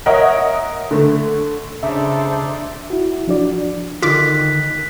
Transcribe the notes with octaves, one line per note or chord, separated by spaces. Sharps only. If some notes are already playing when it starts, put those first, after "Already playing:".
A#4 C#5 D#5 E5 F#5
D3 A3
C#3 D4 D#4 A4 C5 D5 E5
E4 F#4
F3 D4 F#4 D5
D3 D#3 F4 D5 F#6 B6